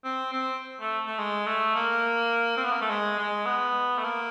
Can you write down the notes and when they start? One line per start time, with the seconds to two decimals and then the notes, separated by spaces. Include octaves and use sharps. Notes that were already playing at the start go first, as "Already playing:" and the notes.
0.04 C4
0.33 C4
0.81 A3
1.06 A3
1.19 G#3
1.46 A3
1.75 A#3
2.57 C4
2.65 B3
2.73 A#3
2.81 A3
2.90 G#3
3.19 G#3
3.46 B3
3.98 A3
4.04 A#3